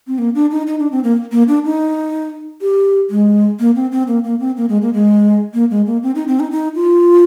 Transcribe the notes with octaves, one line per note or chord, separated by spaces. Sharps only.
C4
A#3
D4
D#4
D#4
D4
C4
A#3
A#3
D4
D#4
G4
G#3
A#3
C4
C4
A#3
A#3
C4
A#3
G#3
A#3
G#3
A#3
G#3
A#3
C4
D#4
C4
D#4
D#4
F4